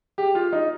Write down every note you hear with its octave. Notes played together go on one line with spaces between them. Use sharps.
G4
F4
D#4